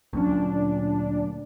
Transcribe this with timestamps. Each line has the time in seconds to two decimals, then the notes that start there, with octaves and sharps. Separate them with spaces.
0.13 D2 A#2 F#3 C#4 D4